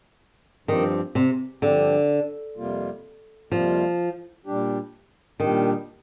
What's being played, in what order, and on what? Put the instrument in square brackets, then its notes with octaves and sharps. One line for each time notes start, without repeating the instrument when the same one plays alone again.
[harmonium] G2 F3 C4 G4 [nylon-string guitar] D#3
[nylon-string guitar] C3
[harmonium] G2 F3 C4 G4 [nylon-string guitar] D3
[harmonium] F2 C3 G3 A#3 F4
[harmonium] F2 C3 G3 A#3 F4 [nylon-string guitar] F3
[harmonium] A#2 G3 D4 G4
[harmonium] A#2 G3 D4 G4 [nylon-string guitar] D#3